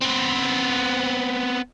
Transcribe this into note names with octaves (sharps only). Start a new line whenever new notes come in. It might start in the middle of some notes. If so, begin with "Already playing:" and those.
B3 C4